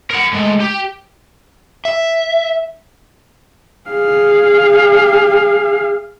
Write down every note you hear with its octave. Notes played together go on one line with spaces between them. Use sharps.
A#4 F#5
A2 G#3
G4
E5
G#4 F5